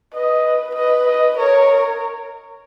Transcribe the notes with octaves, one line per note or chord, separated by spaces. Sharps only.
B4 D#5
B4 D#5
D#5
A#4 C#5